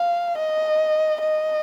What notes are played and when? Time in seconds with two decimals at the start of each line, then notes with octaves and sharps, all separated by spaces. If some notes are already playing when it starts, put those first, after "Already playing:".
Already playing: F5
0.38 D#5
1.21 D#5